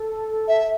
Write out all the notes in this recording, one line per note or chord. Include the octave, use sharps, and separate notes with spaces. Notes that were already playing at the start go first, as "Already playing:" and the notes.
Already playing: A4
E5